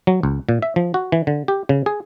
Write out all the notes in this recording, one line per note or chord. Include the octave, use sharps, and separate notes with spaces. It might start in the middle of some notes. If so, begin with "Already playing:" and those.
F#3
C#2
A#2
E5
F3
F#4
E3
D3
G4
C#3
G#4